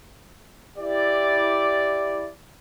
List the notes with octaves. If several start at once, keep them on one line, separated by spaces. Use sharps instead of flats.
E4 G4 D5